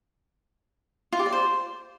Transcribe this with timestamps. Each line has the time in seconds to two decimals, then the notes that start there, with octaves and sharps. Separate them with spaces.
1.12 F4
1.19 G4
1.26 D5
1.32 C5